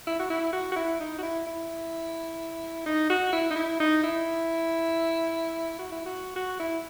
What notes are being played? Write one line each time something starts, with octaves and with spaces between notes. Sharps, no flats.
E4
F#4
E4
F#4
F#4
E4
D#4
F#4
E4
E4
D#4
F#4
E4
D#4
E4
D#4
E4
F#4
E4
F#4
F#4
E4